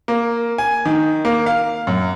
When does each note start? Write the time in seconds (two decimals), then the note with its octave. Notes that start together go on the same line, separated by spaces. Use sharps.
0.08 A#3
0.58 G#5
0.85 D#3
1.25 A#3
1.46 F5
1.87 F#2